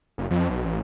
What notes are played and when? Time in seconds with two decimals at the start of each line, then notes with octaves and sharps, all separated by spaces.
0.18 F#1
0.30 F2
0.50 B1
0.65 A1